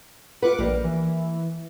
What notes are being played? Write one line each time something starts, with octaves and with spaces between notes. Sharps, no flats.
F4 B4 F#5 D6
A#1 G3 A#3
E3